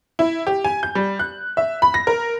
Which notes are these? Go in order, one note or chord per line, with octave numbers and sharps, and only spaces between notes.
E4
G4
G#5
G6
G3
F#6
E5
B5
A#6
A#4